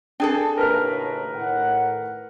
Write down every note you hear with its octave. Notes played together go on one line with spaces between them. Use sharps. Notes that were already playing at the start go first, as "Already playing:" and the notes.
D4 G#4 A4 G5
D#2 A2 C#3 A#4 B4 F6
A2 D#3 F#5